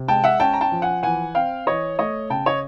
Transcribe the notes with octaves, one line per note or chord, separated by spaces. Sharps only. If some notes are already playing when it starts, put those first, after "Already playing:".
Already playing: C3
G#3 G5 A5
E5 F#5
C#4 G5 A5
A#5
G5 A5
F3
F#5 G#5
E3 F#5 G#5
C4 F5 G5
E3 C#5 D#5
A3 C#5 D#5
C#3 G5 A5
C#5 D#5